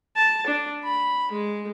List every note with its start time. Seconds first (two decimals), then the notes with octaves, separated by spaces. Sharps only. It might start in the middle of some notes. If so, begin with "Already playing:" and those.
0.16 A5
0.47 D4
0.84 B5
1.32 G#3